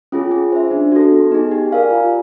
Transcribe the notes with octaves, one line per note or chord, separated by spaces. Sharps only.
C#4 F4 G#4
G#4
C5 E5
D4
F#4 A4
B3
D#4 G#4
G4
A#4 D5 F5 G#5
F4